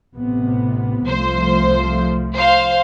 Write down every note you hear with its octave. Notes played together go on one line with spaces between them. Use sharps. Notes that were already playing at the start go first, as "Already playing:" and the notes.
A1 C3 B3
C2 F3 A3 C5
C5 F5